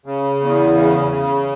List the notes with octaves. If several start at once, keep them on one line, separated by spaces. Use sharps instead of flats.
C#3
E2
C#3
C#3